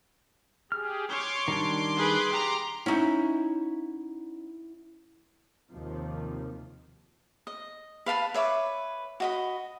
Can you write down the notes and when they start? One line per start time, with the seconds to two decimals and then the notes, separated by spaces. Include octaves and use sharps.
0.72 G4 G#4 F6
1.09 C#5 C6 D6
1.48 D#3 G3 D4
1.96 G#4 B4
2.32 G4 A#5
2.86 C#4 D#4 E4 F#5
5.70 D#2 C3 D#3 F3
7.47 D#5
8.06 B4 F5 A5 B5
8.34 B4 C#5 E5 D6
9.20 F#4 D#5 B5